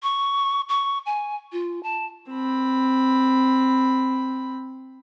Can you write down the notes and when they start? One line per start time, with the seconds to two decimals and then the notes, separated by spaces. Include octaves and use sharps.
0.03 C#6
0.69 C#6
1.06 G#5
1.53 F4
1.83 A5
2.31 C4 B5